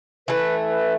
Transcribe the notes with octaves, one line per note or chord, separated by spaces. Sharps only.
E3 A3 B4
B4